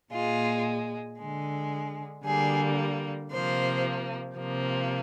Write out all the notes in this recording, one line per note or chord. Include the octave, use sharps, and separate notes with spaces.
A#2 G#3 F4
D3 G#3
D3 G3 A#3 G#4
C3 F3 A#3 C5
C3 F3 A#3